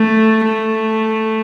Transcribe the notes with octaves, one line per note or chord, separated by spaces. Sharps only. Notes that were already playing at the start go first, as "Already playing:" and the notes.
Already playing: A3
A3